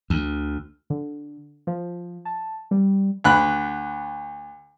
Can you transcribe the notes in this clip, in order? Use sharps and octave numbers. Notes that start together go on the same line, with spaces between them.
D2
D3
F3
A5
G3
D2 B5 F#6